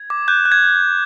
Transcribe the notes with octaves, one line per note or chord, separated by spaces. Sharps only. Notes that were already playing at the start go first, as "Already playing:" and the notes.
Already playing: G#6
D6
F#6 G6
F#6
G#6